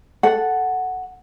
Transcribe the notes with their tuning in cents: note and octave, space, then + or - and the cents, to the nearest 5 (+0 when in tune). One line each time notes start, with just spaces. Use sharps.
A4 +0 F#5 +0